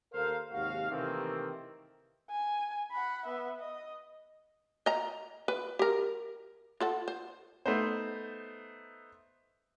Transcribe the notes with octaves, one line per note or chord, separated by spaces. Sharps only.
D#2 A4 A#4 C5 F5
D#2 G#2 C3 F#4 F5
C3 D#3 E3 A3 A#3 C4
G#5
F#5 B5
B3 E5
D#5
D#5 A#5
B4
G4 A#4
F4 A4 F#5
C5
A3 B3 D#4 C5